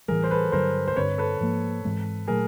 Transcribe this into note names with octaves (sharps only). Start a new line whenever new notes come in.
A2 E3 G3 G#4 A#4
C5
A4 B4
G2 D3 F#3 A#4 C5
C5
G2 D3 G3 C4 B4 C#5
A4 B4
G#2 F3 A#3
G#2 E3 G#3 C4
A#2 F#3 A3 G#4 A#4